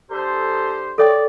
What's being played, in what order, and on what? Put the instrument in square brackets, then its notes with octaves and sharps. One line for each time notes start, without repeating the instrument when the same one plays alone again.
[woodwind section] D3 G4 C5 [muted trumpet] A4
[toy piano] A4 C#5 G5 [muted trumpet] D5